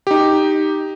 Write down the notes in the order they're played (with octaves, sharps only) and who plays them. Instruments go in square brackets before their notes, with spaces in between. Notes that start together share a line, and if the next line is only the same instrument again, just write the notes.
[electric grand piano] D#4 G4